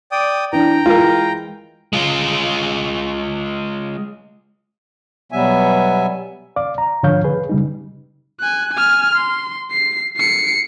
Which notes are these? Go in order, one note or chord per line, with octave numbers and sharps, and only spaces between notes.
D5 G5 D#6
E3 D4 G5 A#5
E3 G#3 F4 A#4
G#3 F4
B2 F#3 G3 B3 E5 G#5
D5 F5 D6
A#5
G#2 D3 F3 C#5 F5 G6
G#4 B4
C#3 G3 D#4
G#5 F#6
G#5 F6
C6
C7
C7 C#7